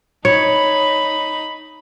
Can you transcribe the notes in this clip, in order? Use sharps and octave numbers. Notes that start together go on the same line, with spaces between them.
D#4 C#5 B5